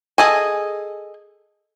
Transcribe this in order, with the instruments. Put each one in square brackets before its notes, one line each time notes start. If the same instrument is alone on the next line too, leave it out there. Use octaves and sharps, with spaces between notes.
[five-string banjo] G#4 A4 D#5 G#5